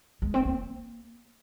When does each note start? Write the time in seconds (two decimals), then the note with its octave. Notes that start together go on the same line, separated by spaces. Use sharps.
0.22 G#3
0.34 C4
0.45 A#3